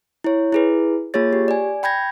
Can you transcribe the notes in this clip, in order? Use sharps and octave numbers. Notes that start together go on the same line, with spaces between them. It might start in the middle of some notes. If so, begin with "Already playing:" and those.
E4 C#5
E4 G#4 B4
A#3 F4 G#4 C#5 A6
G4
D5 G#5
G5 B5 G6 G#6 A#6